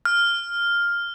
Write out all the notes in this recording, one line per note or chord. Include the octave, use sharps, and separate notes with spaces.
F6